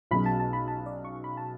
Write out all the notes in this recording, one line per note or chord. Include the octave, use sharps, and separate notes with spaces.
B1 B2 F#3 C#4 G#4 B5
A5
A5
B5
A5
D5
C#6
B5
A5